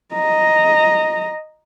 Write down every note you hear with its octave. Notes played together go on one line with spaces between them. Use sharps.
D#5 A#5